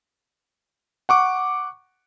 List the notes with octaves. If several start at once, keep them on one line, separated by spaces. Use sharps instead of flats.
F#5 C#6 D6